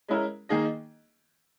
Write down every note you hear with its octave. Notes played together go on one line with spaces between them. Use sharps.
G#3 C#4 E4 A#4
D#3 A#3 D#4 G#4 D#5